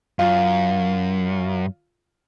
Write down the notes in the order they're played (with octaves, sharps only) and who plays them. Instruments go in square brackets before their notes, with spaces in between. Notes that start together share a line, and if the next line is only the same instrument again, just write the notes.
[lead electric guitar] F#2 [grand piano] F4